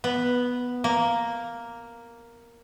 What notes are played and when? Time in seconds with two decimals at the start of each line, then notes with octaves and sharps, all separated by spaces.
0.04 B3
0.84 A#3